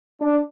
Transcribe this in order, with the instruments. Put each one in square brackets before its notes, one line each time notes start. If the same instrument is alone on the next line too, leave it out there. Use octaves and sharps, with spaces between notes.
[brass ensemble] D4